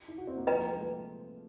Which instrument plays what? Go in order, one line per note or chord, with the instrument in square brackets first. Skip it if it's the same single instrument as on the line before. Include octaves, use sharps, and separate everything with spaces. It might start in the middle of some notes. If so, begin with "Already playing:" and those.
[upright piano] E4
F#4
C4
A#3
[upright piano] F3 [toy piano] B4 D#5 G5 A#5
[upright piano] A#3
A3
G#3